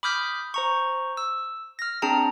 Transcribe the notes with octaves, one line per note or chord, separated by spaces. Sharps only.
B5 D6 D#6 F6 G6 B6
C5 A#5 C#6
E6
F6 A#6
C4 D4 G#4 A5 A#5